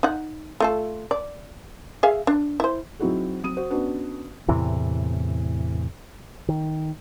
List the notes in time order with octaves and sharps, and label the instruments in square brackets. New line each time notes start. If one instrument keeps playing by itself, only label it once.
[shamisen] D#4 F#5
A3 F4 A4
D5
G#4 E5 F5
D4
E4 C5
[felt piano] F#3 C4 D#4 E4 F#4 G#4
F#3 C4 D#6 D#7
F#4 C5
B3 C#4 D4 F#4 B4 F#5
[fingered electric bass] E2 A2 C3 E3
D#3